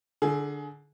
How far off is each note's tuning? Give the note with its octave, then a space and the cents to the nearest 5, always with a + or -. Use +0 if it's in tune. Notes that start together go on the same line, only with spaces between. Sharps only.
D3 +0 G#4 +25